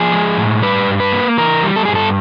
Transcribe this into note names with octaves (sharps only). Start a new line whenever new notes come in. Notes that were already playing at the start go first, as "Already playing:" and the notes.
Already playing: F3 G#4
G#3
A2
G3 B4
G2
B4
A#3
E3 A#4
G3
A4
G2 G#4
A4